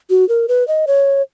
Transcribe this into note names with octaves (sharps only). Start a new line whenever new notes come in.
F#4
A#4
B4
D#5
C#5